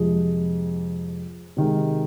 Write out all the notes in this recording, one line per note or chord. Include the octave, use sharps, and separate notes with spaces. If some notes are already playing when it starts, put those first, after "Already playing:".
Already playing: F2 C3 F3 G#3 G#4
C3 D#3 G#3